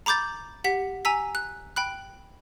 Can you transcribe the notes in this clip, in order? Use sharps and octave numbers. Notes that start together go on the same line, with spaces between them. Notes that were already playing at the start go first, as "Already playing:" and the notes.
A#5 B5 D6 G6 A6
G4 F#5 B6
G#5 A#5 E6 B6
F#6
G5 B5 F#6